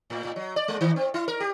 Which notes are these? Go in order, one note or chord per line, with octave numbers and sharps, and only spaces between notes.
A2
A2
F#3
D5
G#3
D#3
C4
E4
A#4
G4